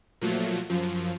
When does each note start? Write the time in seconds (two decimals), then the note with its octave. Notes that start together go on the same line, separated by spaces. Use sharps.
0.21 A#2 F3 F#3 A3
0.69 F#2 F3